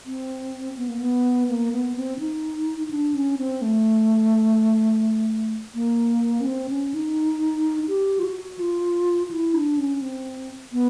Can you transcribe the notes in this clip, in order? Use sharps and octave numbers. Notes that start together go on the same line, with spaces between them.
C4
B3
A#3
B3
A#3
B3
C4
D#4
D4
C#4
C4
A3
A#3
C#4
C4
C#4
D#4
G4
F4
F#4
F4
E4
D4
C#4
C4
B3